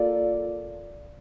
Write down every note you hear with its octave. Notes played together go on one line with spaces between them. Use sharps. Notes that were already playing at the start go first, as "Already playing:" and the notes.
Already playing: A#3 F4 A4 D5